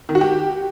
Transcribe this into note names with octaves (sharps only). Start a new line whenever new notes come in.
D#3
F#4
G4